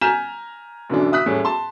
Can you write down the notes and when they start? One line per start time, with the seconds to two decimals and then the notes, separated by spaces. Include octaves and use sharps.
0.01 G#5 A#5 F6 G6 B6 E7
0.90 F#2 B2 D3 E3 D4
1.12 E5 D#6 F#6 B6
1.26 E2 A2 G3 C#4
1.45 A5 C6